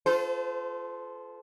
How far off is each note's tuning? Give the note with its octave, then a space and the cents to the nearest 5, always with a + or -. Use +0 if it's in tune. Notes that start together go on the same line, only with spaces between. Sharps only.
F4 +0 A4 -25 C5 -35